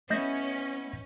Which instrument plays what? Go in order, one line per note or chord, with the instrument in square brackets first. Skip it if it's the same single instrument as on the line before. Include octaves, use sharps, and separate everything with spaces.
[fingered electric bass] A3 [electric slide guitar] B3 E4 [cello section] C#4 [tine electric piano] D#5 G6 A#6